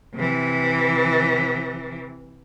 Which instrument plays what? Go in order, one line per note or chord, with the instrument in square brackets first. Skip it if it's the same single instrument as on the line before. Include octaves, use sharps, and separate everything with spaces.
[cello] C3 E3